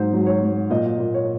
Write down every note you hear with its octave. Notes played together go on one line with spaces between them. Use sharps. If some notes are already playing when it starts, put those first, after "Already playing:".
Already playing: G#2 F#3 C5
F#3
C#5
F#3
A#2 D#5
A#2
C#5